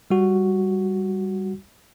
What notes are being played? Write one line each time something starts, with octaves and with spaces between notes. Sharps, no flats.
G3 F#4